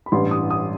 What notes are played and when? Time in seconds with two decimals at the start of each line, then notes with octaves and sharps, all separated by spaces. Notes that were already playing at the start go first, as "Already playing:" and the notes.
0.06 B5
0.12 A1 G2 E3 C6
0.31 D#6
0.50 D#6